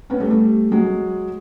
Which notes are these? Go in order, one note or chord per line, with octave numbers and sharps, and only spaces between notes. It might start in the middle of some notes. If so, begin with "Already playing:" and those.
B3 C#4
G3 A3
G3 A3
F#3 G#3